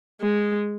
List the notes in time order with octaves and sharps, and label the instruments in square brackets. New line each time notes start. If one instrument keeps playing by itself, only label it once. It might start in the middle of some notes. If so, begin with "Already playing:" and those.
[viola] G#3